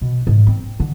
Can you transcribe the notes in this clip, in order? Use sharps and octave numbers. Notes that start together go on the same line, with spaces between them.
B2
G#2
C4
D3